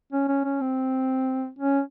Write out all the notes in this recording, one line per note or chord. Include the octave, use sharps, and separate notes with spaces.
C#4
C#4
C#4
C4
C#4